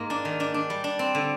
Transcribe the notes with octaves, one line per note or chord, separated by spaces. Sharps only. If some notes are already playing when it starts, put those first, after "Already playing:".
Already playing: G#2 A#3
D4
D#3
D4
D4
G3
D4
C4
D3